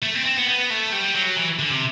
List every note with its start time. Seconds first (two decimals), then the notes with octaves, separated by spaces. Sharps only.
0.03 A3
0.15 C4
0.26 C4
0.37 B3
0.49 B3
0.70 A3
0.92 G3
1.15 F#3
1.37 E3
1.59 D3
1.70 C3